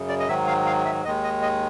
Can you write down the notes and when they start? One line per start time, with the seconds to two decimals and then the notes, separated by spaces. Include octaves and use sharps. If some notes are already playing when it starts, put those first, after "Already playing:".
Already playing: F#2 C#3
0.09 D5
0.20 D#5
0.28 G#2 D#3 F#3 E5
0.48 F5
0.66 F5
0.85 E5
1.05 D#2 D#3 G#3 D#5
1.24 D#5
1.42 D#5